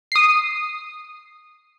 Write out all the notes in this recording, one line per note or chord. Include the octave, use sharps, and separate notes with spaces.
D#6 C7